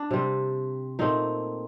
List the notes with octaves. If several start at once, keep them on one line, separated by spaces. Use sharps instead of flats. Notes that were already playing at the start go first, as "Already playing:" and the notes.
Already playing: D4
C3 G3 C4
A#2 A3 C4 D#4